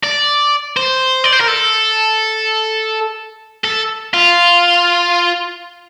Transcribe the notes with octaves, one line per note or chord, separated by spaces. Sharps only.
D5
C5
D5
C5
A#4
A4
A4
F4